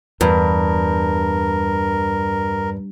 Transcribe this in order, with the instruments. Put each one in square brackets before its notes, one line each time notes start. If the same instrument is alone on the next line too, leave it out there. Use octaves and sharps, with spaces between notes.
[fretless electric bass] E2 [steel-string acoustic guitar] G2 [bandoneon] A#4